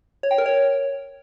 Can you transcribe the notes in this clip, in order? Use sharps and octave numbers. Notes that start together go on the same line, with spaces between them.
C#5
G5
A#4
C#5